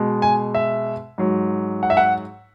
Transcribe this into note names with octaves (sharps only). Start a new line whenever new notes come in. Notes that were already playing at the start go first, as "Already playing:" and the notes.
Already playing: B2 G#3
G#5
E5
G#2 F#3
F#5
E5
F#5